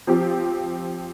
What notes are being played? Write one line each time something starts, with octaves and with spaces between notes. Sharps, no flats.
F3 C4 G4